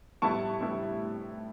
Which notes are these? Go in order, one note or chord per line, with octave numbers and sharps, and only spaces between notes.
A2 G3 B3 E4 A5 C#6
A2 G3 B3 E4